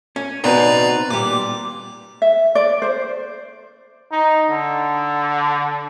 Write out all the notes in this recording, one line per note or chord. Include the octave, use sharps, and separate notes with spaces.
C#4
B2 C4 D#4 B4 D5 A#5
A#2 G3 D6
E5
D5
C5
D#4
D3